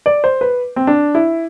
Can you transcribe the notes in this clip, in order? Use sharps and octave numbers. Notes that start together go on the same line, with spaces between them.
D5
C5
B4
C4
D4
E4